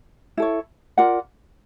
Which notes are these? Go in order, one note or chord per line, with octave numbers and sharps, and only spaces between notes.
E4 A4 C#5
F4 A#4 D5 F#5